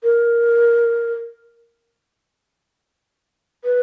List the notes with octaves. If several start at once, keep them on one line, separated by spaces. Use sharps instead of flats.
A#4
B4